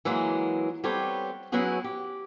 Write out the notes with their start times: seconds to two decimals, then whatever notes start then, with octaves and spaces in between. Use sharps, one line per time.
0.05 E3 F#3 G#3 A#3
0.84 G3 B3 C4 G4 A4 C#5
1.52 F#3 B3 C#4 E4 F#4 G#4
1.84 G4